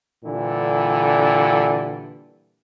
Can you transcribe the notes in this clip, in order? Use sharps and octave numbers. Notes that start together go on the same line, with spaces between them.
A#2 D3 E3 G3